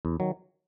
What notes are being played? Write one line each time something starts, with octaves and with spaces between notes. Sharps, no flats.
E2
D#3 F#3